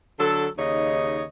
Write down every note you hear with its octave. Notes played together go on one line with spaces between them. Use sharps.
D3 F#3 A4
D#2 C#3 D#4 C#5 D#5